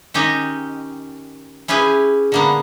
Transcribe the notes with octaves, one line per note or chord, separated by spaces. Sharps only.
D#3 C#4 G4 D#5
C#4 E4 G4 G#4 B4
D3 A#3 B3